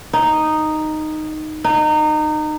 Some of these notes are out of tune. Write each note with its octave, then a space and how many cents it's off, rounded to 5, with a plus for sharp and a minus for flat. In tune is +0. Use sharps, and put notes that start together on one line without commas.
D#4 -5
D#4 -25